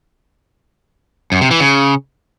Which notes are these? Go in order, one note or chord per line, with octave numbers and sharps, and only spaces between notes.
F#2
C3
E3
C#3